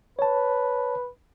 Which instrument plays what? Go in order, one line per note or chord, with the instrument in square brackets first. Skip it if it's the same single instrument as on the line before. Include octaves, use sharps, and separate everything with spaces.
[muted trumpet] B4 [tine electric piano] C#5 A5